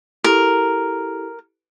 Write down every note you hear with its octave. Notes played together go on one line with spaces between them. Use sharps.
E4 G4 A4 A#4